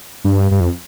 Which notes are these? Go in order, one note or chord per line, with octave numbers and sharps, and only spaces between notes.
G2
G2
F2